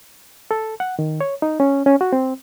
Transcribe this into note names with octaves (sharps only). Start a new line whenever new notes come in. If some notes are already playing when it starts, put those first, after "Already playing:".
A4
F#5
D#3
C#5
D#4
C#4
C#4
F#4
C4